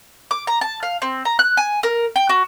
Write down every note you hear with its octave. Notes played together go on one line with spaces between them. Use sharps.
D6
A#5
A5
F5
C4
A#5
F#6
G#5
A#4
G5
F#4